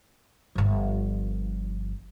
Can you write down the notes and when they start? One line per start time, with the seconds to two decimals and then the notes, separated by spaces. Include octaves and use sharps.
0.55 G1 F3